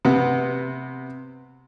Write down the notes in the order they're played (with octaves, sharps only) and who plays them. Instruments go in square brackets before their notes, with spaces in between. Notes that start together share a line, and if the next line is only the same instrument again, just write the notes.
[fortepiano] C3 B3